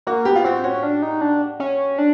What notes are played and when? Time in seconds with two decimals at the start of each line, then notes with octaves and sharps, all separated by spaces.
0.07 A#3 F#4
0.25 B3 G4
0.36 F4
0.44 C4 F#4
0.64 C#4 F#4
0.83 D4
1.03 D#4
1.21 D4
1.60 C#4
1.98 D4